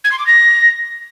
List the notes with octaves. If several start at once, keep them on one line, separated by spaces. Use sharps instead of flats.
G#6
C6
D6
A#6